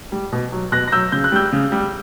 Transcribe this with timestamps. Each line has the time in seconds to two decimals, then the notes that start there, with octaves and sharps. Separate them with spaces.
0.12 G3
0.32 B2
0.52 F#3
0.72 B2 F#6 A#6
0.87 A#6
0.92 F#3 E6 G6
1.12 C#3 G6
1.24 F#6
1.32 G3 E6 G6
1.52 C#3
1.72 G3